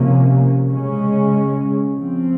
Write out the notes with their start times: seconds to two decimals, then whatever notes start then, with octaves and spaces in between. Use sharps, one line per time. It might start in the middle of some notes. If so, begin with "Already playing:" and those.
Already playing: C3 F3 A#3 C#4
0.70 C#3 G#3 C#4
1.95 F3 C4